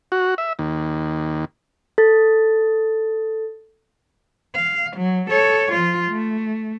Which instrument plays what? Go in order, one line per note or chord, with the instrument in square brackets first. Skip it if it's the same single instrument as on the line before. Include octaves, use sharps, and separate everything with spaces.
[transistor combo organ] F#4
E5
D#2
[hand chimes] A4 A6
[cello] F5
F#3
A4 C#5
F3 F4
A3